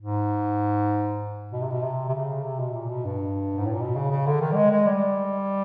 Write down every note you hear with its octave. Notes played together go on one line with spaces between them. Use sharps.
G#2
B2
C3
B2
C3
C3
C#3
C3
B2
A#2
B2
G2
G#2
A2
A#2
B2
C#3
C#3
D3
D#3
G3
G#3
G#3
G3